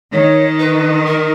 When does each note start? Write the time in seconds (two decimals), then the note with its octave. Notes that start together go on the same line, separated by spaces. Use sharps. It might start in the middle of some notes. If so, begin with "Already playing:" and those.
0.12 D#3 C#5
0.59 B4
1.06 A#4